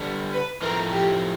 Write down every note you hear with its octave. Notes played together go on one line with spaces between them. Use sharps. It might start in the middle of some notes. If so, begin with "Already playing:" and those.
Already playing: D3 G3 B3
B4
A2 F3 A3 C4 A#4
G4